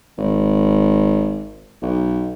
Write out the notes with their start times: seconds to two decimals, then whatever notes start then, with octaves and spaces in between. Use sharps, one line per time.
0.18 G#1
1.82 B1